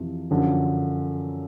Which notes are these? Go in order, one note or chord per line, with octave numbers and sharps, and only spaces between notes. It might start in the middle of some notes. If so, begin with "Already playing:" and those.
Already playing: F2 C3 E3
F#2 D3 F3